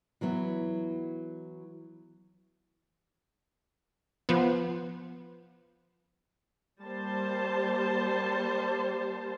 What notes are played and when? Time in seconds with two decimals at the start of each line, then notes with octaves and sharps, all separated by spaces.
0.21 E3 F#3 B3 E4
4.29 F3 B3
6.82 G3 A#3 C5 A5